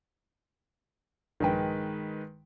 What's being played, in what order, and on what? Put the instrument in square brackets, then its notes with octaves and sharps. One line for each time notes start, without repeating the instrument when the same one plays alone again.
[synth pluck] A#1 G2 G5 [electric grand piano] D#3 G#3 B4